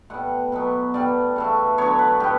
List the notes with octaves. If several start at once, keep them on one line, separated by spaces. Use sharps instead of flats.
A2 G3 B3 F#5
B2 F#3 B3
A2 G3 B3 D5
C#3 E3 A3
D3 F#3 B3 C#5
B4
A2 G3 B3 G4